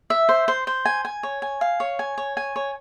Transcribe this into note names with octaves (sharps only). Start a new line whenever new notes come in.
E5
C5
C5
C5
G#5
G#5
C#5
G#5
F5
C#5
G#5
C#5
G#5
C#5